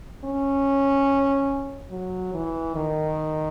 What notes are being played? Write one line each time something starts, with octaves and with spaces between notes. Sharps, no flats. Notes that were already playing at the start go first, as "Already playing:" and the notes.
C#4
F#3
E3
D#3